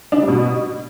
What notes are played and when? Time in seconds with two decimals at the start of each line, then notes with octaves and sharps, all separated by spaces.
0.12 D4
0.17 C#3
0.23 G3
0.28 B2